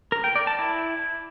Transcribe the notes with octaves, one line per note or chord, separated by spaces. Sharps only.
A#4
G5
D5
A5
E4